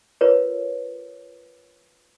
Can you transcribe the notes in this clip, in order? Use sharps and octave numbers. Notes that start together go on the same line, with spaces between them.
F4 A#4 B4 C#5